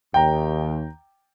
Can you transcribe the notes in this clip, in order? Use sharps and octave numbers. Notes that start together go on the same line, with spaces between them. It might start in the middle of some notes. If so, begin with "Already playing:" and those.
D#2 G5 A#5